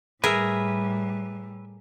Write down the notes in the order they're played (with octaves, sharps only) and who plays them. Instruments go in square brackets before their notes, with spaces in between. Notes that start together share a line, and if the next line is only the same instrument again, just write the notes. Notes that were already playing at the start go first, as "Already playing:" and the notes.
[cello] A2 G3 [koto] G#4 A#4 [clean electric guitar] B4 E5